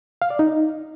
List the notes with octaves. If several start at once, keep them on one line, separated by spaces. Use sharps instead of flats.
F5
D5
D#4